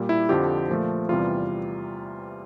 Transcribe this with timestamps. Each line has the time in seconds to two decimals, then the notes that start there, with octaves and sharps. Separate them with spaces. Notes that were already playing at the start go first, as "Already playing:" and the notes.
Already playing: A#2 G3
0.09 E4
0.29 F2 D3 F3 G4
0.69 A#2 F3 A3
1.09 E2 C3 E3 G3 F4